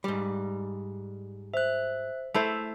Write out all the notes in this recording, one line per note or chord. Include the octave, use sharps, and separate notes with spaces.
G#2 G3
C5 E5 F#6
A3 E4 C5 E5 E6